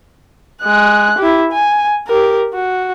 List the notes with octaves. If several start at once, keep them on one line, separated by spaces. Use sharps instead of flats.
G#3 F#6
E4 G4
G#5
G4 A#4
F#4